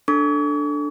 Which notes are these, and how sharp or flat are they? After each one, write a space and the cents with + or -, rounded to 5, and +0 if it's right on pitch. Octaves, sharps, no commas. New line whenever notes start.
D4 +0 A4 +5 C#6 +45